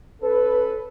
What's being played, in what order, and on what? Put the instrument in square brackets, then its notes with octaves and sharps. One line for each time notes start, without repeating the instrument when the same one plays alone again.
[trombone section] C#4 A4 [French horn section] B4